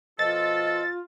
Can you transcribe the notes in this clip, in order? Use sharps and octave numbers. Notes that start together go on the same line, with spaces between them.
B2 F3 F4 A4 D#5 A6